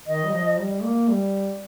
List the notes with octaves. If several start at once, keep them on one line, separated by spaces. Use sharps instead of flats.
D#3 D#5
G3
F3
G3
A#3
G3